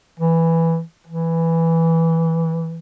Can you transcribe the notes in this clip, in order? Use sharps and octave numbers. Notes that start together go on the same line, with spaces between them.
E3
E3